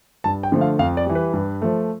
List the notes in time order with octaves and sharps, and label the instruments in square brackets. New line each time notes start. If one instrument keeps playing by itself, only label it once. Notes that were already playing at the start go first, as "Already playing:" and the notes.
[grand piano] G2 A5
G5
D3 F3 A3
F5
F2 F5
D5
E3 G3
B4
G2
F3 A3